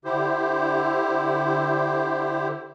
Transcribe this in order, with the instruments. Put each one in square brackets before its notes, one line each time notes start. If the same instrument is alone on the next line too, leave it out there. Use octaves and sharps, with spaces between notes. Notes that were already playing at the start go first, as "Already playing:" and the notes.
[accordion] D3 E4 G4 C5